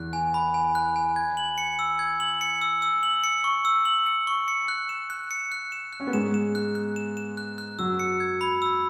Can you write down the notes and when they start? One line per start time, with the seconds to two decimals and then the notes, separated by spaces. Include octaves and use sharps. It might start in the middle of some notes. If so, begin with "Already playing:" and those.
Already playing: E2 E3 F#6
0.13 G#5
0.34 B5
0.54 G#5
0.75 F#6
0.96 G#5
1.16 G#6
1.37 F#7
1.58 C#7
1.79 E6
1.99 G#6
2.20 F#7
2.41 C#7
2.62 E6
2.82 E6
3.03 F#7
3.24 C#7
3.44 C#6
3.65 E6
3.85 F#7
4.06 C#7
4.27 C#6
4.48 C#7
4.68 F#6
4.89 E7
5.10 F#6
5.31 C#7
5.52 F#6
5.72 E7
5.93 F#6
6.00 C#4
6.07 B3
6.13 G#2 G#3 E7
6.34 E7
6.55 F#6
6.75 F#6
6.96 E7
7.17 E7
7.37 F#6
7.58 F#6
7.79 F#2 F#3 E6
7.99 C#7
8.20 G#6
8.41 B5
8.62 E6